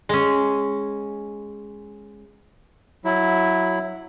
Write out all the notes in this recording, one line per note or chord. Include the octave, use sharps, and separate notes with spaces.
G#3 C#4
F#3 E4